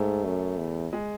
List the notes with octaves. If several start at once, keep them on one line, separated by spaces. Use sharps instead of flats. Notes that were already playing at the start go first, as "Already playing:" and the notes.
Already playing: G#2 A3
F#2
E2
G#3